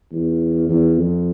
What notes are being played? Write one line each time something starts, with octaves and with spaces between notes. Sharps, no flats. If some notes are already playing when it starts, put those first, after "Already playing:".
E2
E2
F2